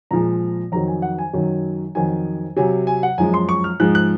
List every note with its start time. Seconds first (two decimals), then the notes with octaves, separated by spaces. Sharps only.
0.11 A#2 F3 G#3 A#5
0.72 F2 D#3 F#3 A#5
0.88 G#5
1.02 F#5
1.19 G#5
1.33 F#2 D#3 F#3
1.95 F2 D#3 F#3 G#5
2.57 C3 F#3 G#5
2.87 G#5
3.03 F#5
3.18 F#2 F3 G#3 G#5
3.34 C6
3.49 C#6
3.64 F6
3.80 G#2 F3 G#3 F#6
3.95 F#6